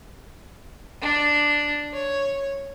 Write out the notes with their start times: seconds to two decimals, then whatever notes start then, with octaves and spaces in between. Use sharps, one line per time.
1.01 D4
1.93 C#5